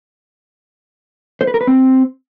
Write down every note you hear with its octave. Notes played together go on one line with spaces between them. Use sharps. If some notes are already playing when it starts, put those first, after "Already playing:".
C5
B4
A#4
B4
C4